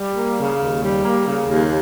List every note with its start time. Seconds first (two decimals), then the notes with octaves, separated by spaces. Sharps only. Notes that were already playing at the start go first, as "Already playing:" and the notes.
Already playing: G3
0.16 A#3
0.38 C#3
0.60 D#2
0.82 G3
1.04 A#3
1.27 C#3
1.49 D#2